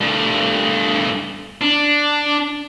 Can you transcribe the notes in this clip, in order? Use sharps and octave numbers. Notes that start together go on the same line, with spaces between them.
G2 A3
D4